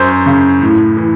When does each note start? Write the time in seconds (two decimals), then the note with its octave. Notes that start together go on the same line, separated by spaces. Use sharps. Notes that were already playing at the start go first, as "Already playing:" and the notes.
Already playing: F#2 C5
0.26 C#3
0.62 A2
0.97 E3